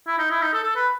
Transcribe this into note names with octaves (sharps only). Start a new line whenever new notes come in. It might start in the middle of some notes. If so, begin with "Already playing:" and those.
E4
D#4
E4
D#4
A4
A4
B4